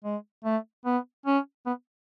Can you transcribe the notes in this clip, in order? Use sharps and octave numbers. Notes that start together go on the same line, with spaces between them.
G#3
A3
B3
C#4
B3